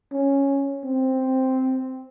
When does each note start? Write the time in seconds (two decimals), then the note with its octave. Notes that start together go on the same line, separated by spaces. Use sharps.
0.12 C#4
0.84 C4